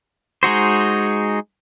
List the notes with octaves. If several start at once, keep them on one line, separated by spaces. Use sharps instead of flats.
G#3 D#4 F#4 C5